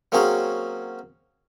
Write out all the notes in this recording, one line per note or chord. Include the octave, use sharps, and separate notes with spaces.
F#3 A#3 C4 C#4 G#4 C#5